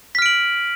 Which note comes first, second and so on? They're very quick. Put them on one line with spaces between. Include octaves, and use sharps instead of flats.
B6 F6 D7 F#7